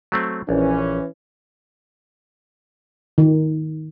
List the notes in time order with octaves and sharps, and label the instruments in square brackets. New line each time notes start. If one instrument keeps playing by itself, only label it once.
[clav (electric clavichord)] F#3 A3 C4
[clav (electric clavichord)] A#1 [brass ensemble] E3 C#4
[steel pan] D#3